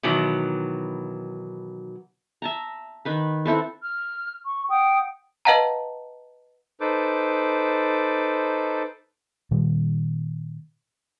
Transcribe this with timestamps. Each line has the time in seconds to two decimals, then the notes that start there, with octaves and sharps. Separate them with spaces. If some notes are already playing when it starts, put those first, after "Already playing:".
0.03 B2 D#3 E3 F#3
2.42 E5 A5 A#5
3.05 D#3 B4 B5
3.45 C4 E4 A4 B4
3.83 F6
4.46 C#6
4.70 F#5 G5 D#6
5.45 B4 D#5 F5 F#5 A5 A#5
6.80 D#4 A4 B4 C5 D6
9.51 A#2 D#3 G3